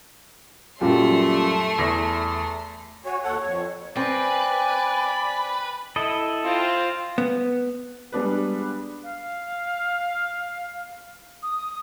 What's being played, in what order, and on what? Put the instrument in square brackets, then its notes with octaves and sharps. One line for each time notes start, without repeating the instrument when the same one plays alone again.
[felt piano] F#2 A#2 G3 [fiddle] A3 C6
[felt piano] E2 A#6 B6
[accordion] F#4 C#5 [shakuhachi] G#5
[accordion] D#2 A4 F#5 [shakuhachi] C#5
[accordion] F2
[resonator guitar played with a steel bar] C4 [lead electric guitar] B4 [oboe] D5 [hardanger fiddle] G#5
[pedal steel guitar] E4 A4 D#5
[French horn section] C4 F4
[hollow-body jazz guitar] B3
[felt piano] G3 G#3 B3 D4 B4
[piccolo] F5
D#6